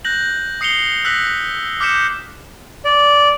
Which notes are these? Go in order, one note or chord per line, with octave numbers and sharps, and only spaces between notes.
F#6 G6 A#6 F#7
D#6 C7 C#7 F7 G7
E6 F#6 A#6 B6 F#7
B6
D6 F6 G6 B6 C#7 E7
D5